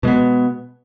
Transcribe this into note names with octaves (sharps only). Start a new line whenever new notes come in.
B2 G#3 B3